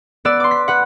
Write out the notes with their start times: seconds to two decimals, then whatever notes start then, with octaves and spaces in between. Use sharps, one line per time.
0.25 B3 B4 D5 E6 E7
0.40 C6 D6
0.51 B6
0.68 B4 F#5